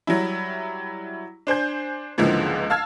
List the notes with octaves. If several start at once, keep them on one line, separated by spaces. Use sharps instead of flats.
F#3 G3 E4
D4 C5 G#5 G6
C#2 G#2 D3 E3 F3 A#3
F5 A5 E6 F6 G#6